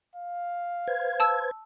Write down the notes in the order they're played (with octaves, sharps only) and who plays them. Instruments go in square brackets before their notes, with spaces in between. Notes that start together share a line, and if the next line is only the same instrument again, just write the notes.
[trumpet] F5
[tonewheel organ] B4 C5 G#6
[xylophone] A5 E6